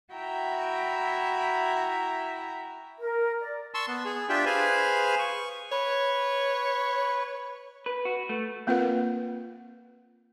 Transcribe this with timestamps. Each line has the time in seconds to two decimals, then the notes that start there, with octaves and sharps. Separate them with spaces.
0.13 E4 F#4 E5 G5 A#5
2.99 A#4
3.40 D5
3.74 A5 C6 C#6 E6
3.88 B3
4.05 G#4
4.29 D4 F4 G4 E5 G5
4.46 G#4 B4 C5 F5 G#5
5.19 C#6
5.72 B4 C#5
7.86 B4
8.05 F#4
8.29 A3
8.67 A#3 C4 F4 A#4 B4 F#5